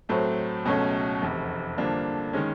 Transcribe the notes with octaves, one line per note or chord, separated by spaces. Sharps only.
A2 F#3 A3 C4
C#2 B2 F#3 A3 C#4
F1 E2 C3
G2 D3 F3 A#3 D4
D#3 G#3 C#4